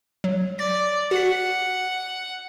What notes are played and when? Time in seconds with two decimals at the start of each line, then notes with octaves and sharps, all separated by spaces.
0.24 F#3
0.59 D5 A6
1.11 F#4 F#5 B6